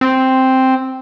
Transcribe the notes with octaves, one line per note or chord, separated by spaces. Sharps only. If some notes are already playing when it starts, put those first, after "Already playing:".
C4